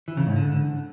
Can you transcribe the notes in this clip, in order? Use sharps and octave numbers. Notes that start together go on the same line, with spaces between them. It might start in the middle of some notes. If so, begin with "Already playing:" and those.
E3
C#3
G#2
D3